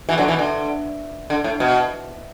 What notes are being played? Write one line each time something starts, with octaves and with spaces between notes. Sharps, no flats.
B2 E3
D3 F#3
B2 E3
D3
D3
A2
B2